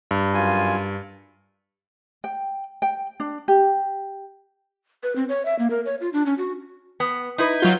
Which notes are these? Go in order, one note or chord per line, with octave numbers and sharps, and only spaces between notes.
G2
F#2 F4 G#5
G5
G5
D4
G4
B4
C4
C#5
E5
A#3
A#4
C#5
F4
D4
C#4
F#4
B3
D#4 E4 B4
F#3 F4 G6